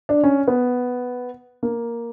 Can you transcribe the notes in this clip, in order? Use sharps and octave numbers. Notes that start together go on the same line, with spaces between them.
D4
C#4
B3
A#3